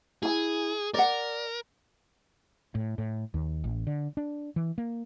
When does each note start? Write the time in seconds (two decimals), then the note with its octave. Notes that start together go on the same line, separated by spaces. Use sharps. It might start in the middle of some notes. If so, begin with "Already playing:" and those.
0.23 E4 G#4 G#5
0.94 A#4 D5 F#5
2.75 A2
2.98 A2
3.34 D#2
3.64 A1
3.87 D3
4.17 D4
4.56 E3
4.78 A#3